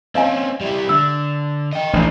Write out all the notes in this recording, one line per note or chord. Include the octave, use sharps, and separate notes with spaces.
C4 C#4 D#5 F5 G#5
G3 E4
D3 E6
D#5 G5
A1 D4 D#4